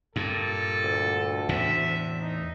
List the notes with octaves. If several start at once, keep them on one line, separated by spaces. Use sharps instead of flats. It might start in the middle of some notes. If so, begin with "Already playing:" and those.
G2 A#2 A4
D2
E2 A2 C3 E5
D#4